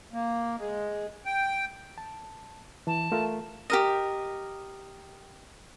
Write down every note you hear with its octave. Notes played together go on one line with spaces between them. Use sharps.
A#3
G#3
G5
A5
E3 A5
A3 F4 A#4
G4 A#4 D#5